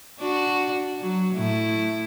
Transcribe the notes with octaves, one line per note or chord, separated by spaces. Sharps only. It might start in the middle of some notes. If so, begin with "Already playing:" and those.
D4 F#4
F#3
A2 E4